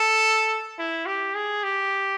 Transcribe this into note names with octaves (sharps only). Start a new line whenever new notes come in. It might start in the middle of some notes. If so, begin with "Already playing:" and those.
Already playing: A4
E4
G4
G#4
G4